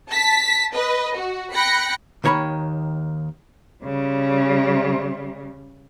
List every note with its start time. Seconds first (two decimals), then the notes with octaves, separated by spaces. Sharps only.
0.10 A5 B6
0.75 B4 D#5
1.16 F#4
1.54 G5 B5 F#6 A#6 C#7
2.24 D#2 D#3 C#5 A#5 B5
3.84 C#3 G3